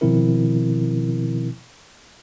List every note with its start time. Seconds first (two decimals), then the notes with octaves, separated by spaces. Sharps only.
0.01 B2 D#3 F3 C4 E4 A#4